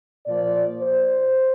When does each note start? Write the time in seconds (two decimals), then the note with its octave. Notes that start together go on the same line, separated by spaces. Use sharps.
0.26 A#2 F3 D5
0.81 C5